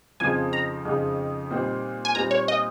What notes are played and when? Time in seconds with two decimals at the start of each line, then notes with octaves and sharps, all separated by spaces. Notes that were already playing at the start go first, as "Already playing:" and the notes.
0.20 F2 C#3 F3 C4 D#4 G#5
0.53 A#5
0.85 F2 C#3 F3 C4 D#4
1.50 A#2 G3 C4 D#4
2.05 G#5
2.15 A#2 G3 C4 D#4 A#5
2.31 C#5
2.48 D#5